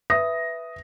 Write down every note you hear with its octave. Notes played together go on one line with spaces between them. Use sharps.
B4 E5 D#6 A#6